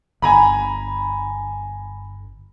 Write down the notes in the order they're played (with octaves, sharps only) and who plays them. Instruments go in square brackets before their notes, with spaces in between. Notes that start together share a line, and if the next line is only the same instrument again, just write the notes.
[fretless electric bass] G1 [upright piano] G#5 A#5 B5